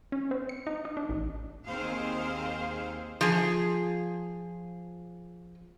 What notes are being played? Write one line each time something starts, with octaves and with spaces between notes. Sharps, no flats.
C#4
C4
C#7
D#4
D#4
D4
A1
D#2 D#3 C4 G#4 C5 F5
F3 G#4